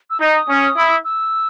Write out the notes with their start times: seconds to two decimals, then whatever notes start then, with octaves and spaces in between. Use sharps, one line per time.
0.10 E6
0.20 D#4 D#6
0.49 C#4
0.77 E4
1.04 E6